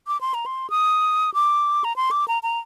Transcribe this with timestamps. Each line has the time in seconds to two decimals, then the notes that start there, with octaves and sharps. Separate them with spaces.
0.07 D6
0.21 C6
0.34 A#5
0.46 C6
0.70 D#6
1.34 D6
1.84 A#5
1.96 C6
2.11 D6
2.28 A#5
2.43 A#5